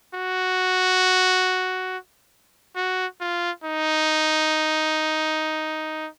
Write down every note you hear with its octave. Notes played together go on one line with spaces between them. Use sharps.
F#4
F#4
F4
D#4